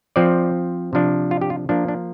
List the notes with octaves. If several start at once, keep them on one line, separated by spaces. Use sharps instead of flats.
F3 C4 D5
C3 F3 D4
F4
G4
F4
F3 A#3 D4
D4